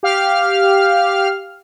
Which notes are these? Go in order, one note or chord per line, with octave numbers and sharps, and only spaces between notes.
G4 F5 F6